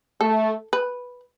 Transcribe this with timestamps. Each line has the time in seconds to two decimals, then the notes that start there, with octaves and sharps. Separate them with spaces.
0.21 A3 A4
0.73 B4